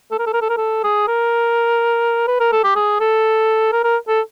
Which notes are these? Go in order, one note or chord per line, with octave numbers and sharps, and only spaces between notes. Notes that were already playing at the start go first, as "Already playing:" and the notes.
A4
A#4
A4
A#4
A4
A#4
A4
G#4
A#4
B4
A#4
A4
G4
G#4
A4
A#4
A#4
A4